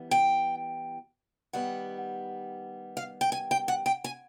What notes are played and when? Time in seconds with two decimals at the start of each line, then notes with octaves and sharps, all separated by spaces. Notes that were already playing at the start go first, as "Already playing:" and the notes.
Already playing: E3 G3 B3
0.11 G5
1.53 D#3 G3 B3 F#5
2.97 F5
3.21 G5
3.32 G#5
3.51 G5
3.68 F#5
3.86 G5
4.04 G#5